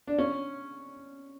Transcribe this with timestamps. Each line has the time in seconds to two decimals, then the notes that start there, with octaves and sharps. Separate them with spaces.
0.07 D4
0.18 C#4